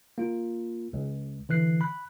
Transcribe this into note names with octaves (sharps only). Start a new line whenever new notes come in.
A#3 F4
C#2
D3 E3 F#6 C7
B5 F#6